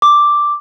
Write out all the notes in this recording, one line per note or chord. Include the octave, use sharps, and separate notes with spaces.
D6